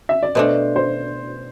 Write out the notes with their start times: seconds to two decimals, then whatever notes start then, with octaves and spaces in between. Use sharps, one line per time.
0.09 E5
0.23 D5
0.35 B2 A3 D4 C5
0.76 C5